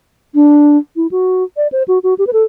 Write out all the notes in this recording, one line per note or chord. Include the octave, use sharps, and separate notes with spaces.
D4
E4
F#4
D5
C5
F#4
F#4
G4
B4
A4